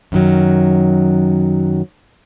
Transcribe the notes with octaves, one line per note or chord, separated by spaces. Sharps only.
F#2 D#3 F#3